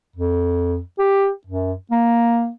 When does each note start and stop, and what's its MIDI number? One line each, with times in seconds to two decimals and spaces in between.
0.16 0.80 41
0.98 1.30 67
1.47 1.73 42
1.91 2.51 58